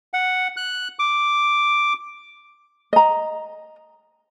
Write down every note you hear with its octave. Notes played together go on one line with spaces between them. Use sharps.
F#5
F#6
D6
D#5 A#5